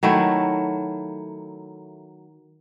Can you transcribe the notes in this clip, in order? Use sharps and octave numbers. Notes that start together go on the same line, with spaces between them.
D#3 F#3 A3 E4